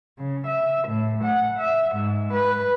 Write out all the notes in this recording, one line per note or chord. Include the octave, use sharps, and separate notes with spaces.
C#3
E5
A2
F#5
E5
G#2
B4